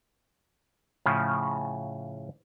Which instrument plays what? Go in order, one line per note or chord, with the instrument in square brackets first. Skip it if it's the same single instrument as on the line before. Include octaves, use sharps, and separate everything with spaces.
[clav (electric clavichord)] A2 C#3 F3